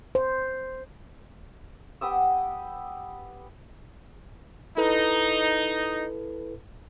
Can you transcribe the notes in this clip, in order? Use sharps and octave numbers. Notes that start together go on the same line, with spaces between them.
C5
B3 G4 D#6 E6
D#4 E4 A4 B4